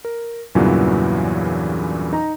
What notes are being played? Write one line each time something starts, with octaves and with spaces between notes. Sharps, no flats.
A#4
E2 G2 A#2 C#3 E3 F#3
D#4 A#5